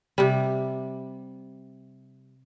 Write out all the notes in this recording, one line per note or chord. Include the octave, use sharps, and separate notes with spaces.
C3 G3